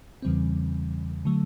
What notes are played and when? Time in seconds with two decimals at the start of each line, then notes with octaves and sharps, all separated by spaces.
0.22 E2 C#3 E3 G3 C4
1.25 D3 F#3 A3